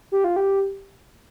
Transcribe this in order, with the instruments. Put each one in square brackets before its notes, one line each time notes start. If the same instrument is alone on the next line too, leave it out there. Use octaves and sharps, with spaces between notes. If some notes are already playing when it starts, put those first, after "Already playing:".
[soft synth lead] G4
F4
G4